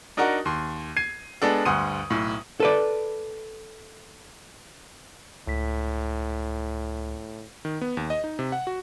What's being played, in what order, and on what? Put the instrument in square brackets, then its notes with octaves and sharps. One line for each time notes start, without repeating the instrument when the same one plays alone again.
[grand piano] D4 D#4 F#4 A#4 F#5
D#2 C6
G#6 C7 D#7
G#3 B3 D4 A4
D2 G2 F#5 C6 D#6 D#7
B1 A2
[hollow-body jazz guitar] A4 B4 D5
[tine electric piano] C#2 B6 [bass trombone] A2
[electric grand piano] D#3
B3
D#2
D#5
D#4
C3
F#5
F#4